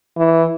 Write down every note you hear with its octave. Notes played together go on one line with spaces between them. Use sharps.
E3